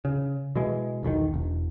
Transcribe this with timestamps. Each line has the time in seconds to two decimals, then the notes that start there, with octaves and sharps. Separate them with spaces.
0.05 C#3
0.55 B2 E3 G#3
1.03 E1 B1 A#2 D#3
1.34 E1